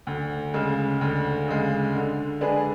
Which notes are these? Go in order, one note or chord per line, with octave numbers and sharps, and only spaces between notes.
D2
C#3 G#3
D2
C#3 G#3
D3
G#3 D4 G#4 B4